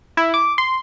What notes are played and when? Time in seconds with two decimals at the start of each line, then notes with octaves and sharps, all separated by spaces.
0.17 E4
0.34 D6
0.58 C6